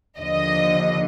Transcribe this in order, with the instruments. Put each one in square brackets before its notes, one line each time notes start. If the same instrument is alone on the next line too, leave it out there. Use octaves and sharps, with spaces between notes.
[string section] D#2 D3 F3 D#5